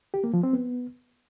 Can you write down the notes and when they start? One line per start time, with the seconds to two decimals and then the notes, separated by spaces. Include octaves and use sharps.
0.14 G4
0.24 A#3
0.34 F3
0.43 C4
0.53 B3